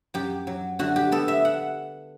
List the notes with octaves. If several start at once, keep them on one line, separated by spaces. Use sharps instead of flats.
F#2 G4
F#3
D3 F#4
G4
B3 A4
E5
F#5